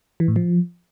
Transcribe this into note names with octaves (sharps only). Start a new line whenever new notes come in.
E3
A2
F3